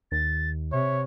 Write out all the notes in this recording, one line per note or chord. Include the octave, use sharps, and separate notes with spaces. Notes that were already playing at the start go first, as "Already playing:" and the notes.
D#2 A6
C3 C#5 E5